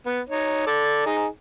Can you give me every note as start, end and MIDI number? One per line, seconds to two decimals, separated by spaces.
0.06 0.21 59
0.29 0.64 63
0.29 0.64 73
0.67 1.04 69
0.67 1.04 74
1.06 1.26 63
1.06 1.26 68